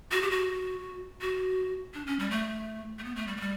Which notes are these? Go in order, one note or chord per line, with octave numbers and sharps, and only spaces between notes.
F#4
G4
F#4
F#4
D4
C#4
G3
A3
A3
B3
A3
G3
A3
G3